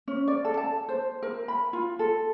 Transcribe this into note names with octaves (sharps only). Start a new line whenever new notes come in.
C#4
D5
A4
A5
C5
A#4
B5
F4
A4